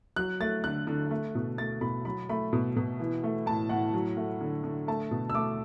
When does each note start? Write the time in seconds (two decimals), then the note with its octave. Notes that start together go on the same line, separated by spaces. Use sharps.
0.16 F#3 F#6
0.40 A3 A6
0.64 D3 F#6
0.87 D3
1.11 A3
1.35 B2
1.58 A3 A6
1.81 B2 B5
2.05 F#3 B5
2.29 A3 B5
2.53 B2
2.76 B2
3.00 E3
3.24 A3
3.46 A2 A5
3.69 A2 F#5
3.94 F#3
4.17 A3
4.41 D3
4.64 D3
4.88 A3 A5
5.11 B2
5.30 E6
5.35 A3 D6